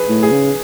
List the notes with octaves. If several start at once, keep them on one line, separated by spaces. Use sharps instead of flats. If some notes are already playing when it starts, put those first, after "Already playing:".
Already playing: G#4 B4
A2
G#4
C#3